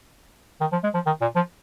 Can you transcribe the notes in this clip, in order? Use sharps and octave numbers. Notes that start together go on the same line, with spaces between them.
D#3
F3
G#3
F3
D#3
A#2
F3